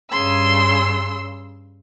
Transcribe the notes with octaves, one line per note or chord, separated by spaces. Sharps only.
G2 C#3 C6 E6